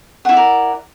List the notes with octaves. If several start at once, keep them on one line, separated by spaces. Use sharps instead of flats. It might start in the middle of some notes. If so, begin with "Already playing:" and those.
E4 A#4 D5 F#5